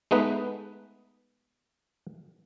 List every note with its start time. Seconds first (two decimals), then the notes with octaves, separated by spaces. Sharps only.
0.11 G#3 A3 B3 D#4 B4